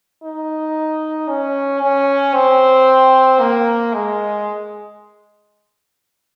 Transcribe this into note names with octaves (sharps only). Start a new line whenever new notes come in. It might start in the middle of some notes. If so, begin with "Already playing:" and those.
D#4
C#4
C#4
C4
A#3
G#3